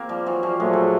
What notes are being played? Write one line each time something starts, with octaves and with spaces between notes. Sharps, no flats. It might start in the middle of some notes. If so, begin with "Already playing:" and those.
Already playing: A#3 C4
F3 G3
E3 F#3
F3 G3
A#2 F#3 G#3 A3
G3